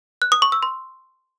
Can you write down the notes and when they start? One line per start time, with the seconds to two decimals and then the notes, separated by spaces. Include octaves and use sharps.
0.22 F#6
0.32 D#6
0.42 C#6
0.52 E6
0.63 C6